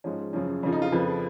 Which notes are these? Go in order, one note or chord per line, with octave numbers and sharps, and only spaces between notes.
G#2 F3 C#4
F#2 C#3 F3 C#4
F2 C#3 F3 C#4
D#4
F4
F2 C#3 F3 B4